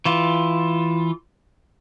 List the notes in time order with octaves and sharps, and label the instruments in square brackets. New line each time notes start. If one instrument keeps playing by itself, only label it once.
[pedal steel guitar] E3 F4